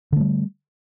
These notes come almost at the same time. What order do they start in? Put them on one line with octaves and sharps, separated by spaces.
D3 A3 G3